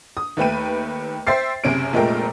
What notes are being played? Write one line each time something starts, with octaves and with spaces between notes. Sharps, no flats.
D#6
D#2 A3 B4 G5 D#7
C5 E5 G5 A6 C7
F#1 C3 C#4 D7
F1 A#2 G#3 A3 A#4 G5